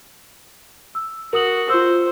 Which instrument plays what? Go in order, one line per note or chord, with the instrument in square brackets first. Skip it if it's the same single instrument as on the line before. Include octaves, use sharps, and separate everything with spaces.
[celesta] E6
[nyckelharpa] F#4 [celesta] A#4 D#6 F#7
[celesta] F4 E6 [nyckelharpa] C5